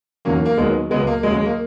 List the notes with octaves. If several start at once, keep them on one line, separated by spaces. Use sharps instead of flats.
E2 D#3 F#3 A#3 C#4
A#3
D#2 D#3 F#3 G#3 B3
C#2 C#3 F#3 G#3 B3
A#3
D#2 C#3 F#3 G#3
G#3
A#3